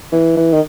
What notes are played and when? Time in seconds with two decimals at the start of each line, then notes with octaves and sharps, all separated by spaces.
0.12 E3
0.37 E3
0.52 D#3